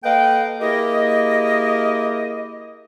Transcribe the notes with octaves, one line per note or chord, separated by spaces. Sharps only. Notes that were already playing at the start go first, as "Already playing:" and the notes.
A#3 A4 B4 D#5 F5 G5
A#3 E4 G4 G#4 A#4 D#5